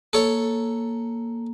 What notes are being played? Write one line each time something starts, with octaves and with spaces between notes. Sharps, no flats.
A#3 A4 C#5